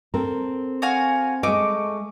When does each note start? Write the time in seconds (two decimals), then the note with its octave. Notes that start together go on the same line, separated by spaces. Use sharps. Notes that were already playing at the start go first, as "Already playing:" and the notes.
0.14 C4 A4 A#4
0.82 F#4 F5 G#5
1.43 G#3 A3 D#5 D6